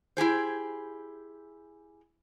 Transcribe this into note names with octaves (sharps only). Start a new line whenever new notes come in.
E4 G4 G#4 C5